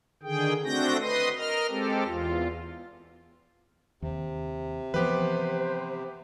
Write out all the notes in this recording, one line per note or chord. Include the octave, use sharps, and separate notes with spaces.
D3 D#3 G#4 G5
A3 C4 D4 F#4 G6 A#6
B4 D#5 C6 D#6
A#4 D#5 F6
G#3 C4 G4 A4
E2 F4
D#2 C3
E3 F3 B3 G4 B4 C5